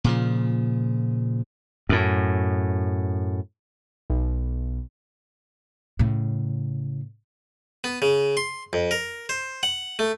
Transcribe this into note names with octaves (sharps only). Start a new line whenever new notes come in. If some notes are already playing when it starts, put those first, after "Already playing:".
A#2 C#3 F3
F#2 A2
B1
A2 C#3
B3
C#3
C6
F2
A#4
C5
F#5
A3